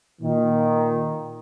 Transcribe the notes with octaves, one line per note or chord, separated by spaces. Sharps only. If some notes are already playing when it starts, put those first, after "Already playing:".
A#2 D#3